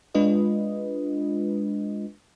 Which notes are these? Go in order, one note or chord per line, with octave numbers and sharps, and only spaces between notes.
G#3 D4 F4 B4 D#5